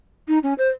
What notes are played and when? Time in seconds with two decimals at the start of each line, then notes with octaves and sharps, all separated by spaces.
0.28 D#4
0.43 C#4
0.58 C5